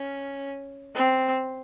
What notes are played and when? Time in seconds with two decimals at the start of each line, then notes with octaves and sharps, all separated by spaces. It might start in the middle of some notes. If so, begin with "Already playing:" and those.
Already playing: C#4
0.95 C4